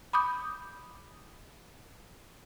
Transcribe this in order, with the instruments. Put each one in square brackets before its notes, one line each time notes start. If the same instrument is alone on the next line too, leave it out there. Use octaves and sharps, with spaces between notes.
[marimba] B5 D6 D#6 G6